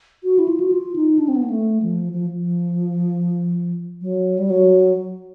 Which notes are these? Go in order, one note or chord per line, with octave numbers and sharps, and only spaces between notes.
F#4
E4
F4
F#4
F4
D#4
D4
C4
B3
A#3
A3
F3
F3
F3
F#3
G3
F#3